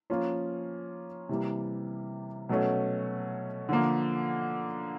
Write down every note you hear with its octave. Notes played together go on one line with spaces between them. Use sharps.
F3 A#3 C#4 F4
C3 E3 G3 A#3
B2 F#3 A3 C#4
D3 F3 A#3